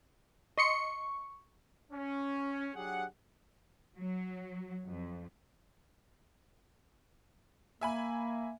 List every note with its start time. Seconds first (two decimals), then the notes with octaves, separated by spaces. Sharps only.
0.58 D#5 C6 C#6 C#7
1.92 C#4
2.75 F#3 D4 G4 G#4 F#5
3.97 F#3
4.87 F2
7.81 A#3 E5 G#5 B5